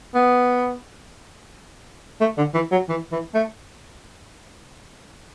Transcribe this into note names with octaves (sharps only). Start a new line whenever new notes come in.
B3
A3
D3
E3
F#3
E3
E3
A3